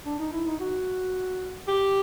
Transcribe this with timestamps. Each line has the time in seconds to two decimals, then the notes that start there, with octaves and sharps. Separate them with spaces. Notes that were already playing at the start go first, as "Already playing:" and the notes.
0.06 D4
0.19 D#4
0.33 E4
0.47 D#4
0.60 F#4
1.68 G4